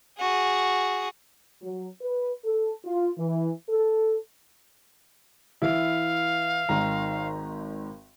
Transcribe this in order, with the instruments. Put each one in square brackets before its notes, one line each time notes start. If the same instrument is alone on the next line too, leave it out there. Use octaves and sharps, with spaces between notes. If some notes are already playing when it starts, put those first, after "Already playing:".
[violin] F#4 G#4
[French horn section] F#3
B4
A4
F4
E3
A4
[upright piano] E3 E4 [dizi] F5
[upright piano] G#1 D#3 A#5